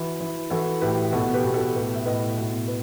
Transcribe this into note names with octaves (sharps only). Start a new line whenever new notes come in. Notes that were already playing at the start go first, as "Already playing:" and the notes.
Already playing: E3 F#4
E3
E3 F#4 A4
A2 G4 B4
B2 F#4 A4
G4 B4
B2
F#4 A4
A2 G4 B4
E5
A2 B4 D#5
B2
B4